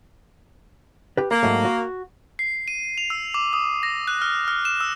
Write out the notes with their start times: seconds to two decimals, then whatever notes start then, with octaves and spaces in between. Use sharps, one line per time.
1.17 G4 B4
1.31 A#3 A#5
1.43 G#2 F#3 A3
1.65 F#4
2.39 C7
2.68 D#7
2.98 F7
3.10 E6
3.34 D6
3.53 D#6
3.83 A#6
4.08 F#6
4.22 F6
4.48 F6
4.65 E7
4.81 E6